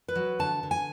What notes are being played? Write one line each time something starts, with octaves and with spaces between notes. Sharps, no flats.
B4
F#3
D3 A5
D3
G#5